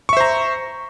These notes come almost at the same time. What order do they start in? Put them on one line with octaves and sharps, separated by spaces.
C#6 E5 C5 A#5